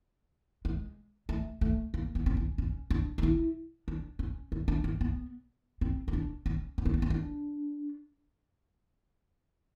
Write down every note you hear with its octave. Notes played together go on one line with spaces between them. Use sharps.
G#3
A3
A3
A#3
B3
C4
C#4
C#4
D4
D#4
E4
D4
C#4
C#4
D4
C4
B3
C4
D#4
D4
C#4
C#4
C4
B3
C4
D4